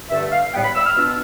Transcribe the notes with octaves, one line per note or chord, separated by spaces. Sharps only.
G2 D3 A3 E5
F5
A2 G3 B3 G5
B5
E6
F6
B2 B3 D4 F4 E6